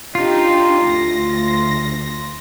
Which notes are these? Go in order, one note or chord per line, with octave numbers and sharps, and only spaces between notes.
D4 D#4 F4 G4
D2 A#6